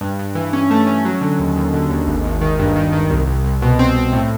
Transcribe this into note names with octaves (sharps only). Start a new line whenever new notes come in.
G2
G2
E3
C#4
A3
C#4
F#3
D3
D#2
D#2
D3
D#2
G#1
G#1
D#3
G2
D#3
D#3
C2
C2
C2
B2
C4
C4
A2